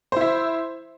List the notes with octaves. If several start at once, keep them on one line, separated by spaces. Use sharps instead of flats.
E4 C5 E5